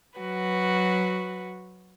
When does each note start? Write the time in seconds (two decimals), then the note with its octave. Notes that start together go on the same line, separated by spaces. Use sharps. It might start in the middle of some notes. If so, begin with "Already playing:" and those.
0.19 F#3 F#4 B4